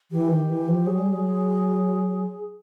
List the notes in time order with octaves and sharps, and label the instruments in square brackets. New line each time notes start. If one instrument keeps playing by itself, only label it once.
[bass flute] E3 [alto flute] G4
[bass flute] D#3
E3
F3
[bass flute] F#3 [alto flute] G#4
[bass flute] G3
F#3